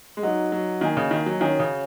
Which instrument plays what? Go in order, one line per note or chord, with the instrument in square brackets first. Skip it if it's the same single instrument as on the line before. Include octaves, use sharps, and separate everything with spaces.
[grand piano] G#3
[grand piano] F#3 [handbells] D#4 F#4 D#5 F#5
[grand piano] F#3
[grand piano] D#3 [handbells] A#3 F#4 D#5 G#5
[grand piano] C#3
D#3
F#3
[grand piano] D#3 [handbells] C#4 F#4 C#5 G#5
[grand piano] C#3